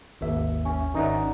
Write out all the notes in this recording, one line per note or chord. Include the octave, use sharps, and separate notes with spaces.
G#1 D#2 E5
C#4
G#1 C#4 D#4 D5 E5 F#5